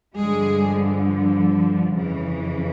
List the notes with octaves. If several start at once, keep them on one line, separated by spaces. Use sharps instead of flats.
G2 D3 F3 G#3 G#4
F2 C#3 E3